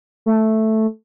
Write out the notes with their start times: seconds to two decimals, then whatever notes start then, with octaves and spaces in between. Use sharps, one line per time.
0.26 A3